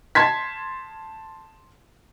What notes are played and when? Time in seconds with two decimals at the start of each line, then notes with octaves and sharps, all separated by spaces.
0.15 A5 C6 G#6 B6